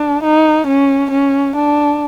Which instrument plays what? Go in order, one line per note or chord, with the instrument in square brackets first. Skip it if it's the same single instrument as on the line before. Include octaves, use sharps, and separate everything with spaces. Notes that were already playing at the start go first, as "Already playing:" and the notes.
Already playing: [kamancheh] D4
D#4
C#4
C#4
D4